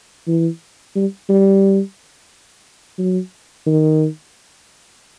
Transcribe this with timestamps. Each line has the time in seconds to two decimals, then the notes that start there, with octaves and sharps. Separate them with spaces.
0.28 E3
0.96 G3
1.29 G3
2.98 F#3
3.66 D#3